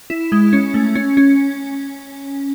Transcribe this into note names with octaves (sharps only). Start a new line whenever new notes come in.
E4
G#3
C#4
A3
C#4
C#4